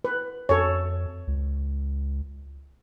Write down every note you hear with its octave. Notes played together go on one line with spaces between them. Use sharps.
B4
F2 A4 C#5
C#2